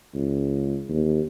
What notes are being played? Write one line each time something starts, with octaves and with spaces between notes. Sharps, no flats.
C#2
D#2